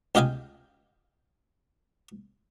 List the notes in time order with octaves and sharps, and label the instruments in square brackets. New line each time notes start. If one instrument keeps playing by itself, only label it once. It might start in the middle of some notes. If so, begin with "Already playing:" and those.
[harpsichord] C#2 G4 D#5 F5 G5 G#5